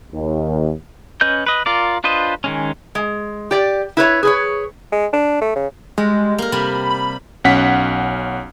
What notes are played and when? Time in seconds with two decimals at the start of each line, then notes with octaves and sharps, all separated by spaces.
0.12 D#2
1.21 C#4 B4 D#5 G6
1.46 B4 D#5
1.66 F4 A#4 D5
2.04 D4 F4 B4 C5 D#5
2.44 D#3 G#3 C#4
2.95 G#3
3.51 G4 D5
3.97 E4 B4 C#5
4.23 G#4 B4 C#5
4.92 G#3
5.13 D4
5.42 A3
5.56 C#3
5.98 G3 G#3
6.38 A#3 A#4
6.52 C3 G3 B5
6.91 B5
7.44 B1 C#4 F#5 B6